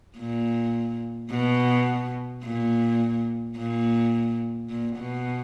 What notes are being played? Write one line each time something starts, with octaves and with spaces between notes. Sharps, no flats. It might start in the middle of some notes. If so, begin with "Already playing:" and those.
A#2
B2
A#2
A#2
A#2
B2